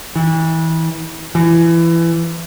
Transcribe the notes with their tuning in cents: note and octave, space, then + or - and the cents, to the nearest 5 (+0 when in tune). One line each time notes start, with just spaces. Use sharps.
E3 -30
E3 +20